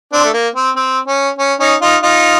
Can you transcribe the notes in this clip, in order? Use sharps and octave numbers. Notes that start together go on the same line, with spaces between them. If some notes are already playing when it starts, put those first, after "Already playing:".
C4 D4
A3
A#3
C4
C4
C#4
C#4
C#4 D#4
D#4 F4
D#4 F4